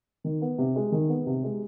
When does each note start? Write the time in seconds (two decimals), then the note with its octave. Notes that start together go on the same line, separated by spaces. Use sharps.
0.24 D#3
0.42 B3
0.58 C3
0.76 G#3
0.92 D#3
1.09 B3
1.26 C3
1.44 G#3